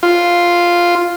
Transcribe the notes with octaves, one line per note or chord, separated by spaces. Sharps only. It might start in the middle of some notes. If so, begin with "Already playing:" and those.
F4